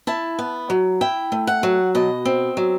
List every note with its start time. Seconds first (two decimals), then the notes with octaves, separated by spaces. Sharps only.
0.07 E4 A5
0.39 B3
0.70 F#3
1.01 E4 G5
1.32 A3
1.47 F#5
1.63 F#3
1.95 B2 D#5
2.25 C4
2.57 F#3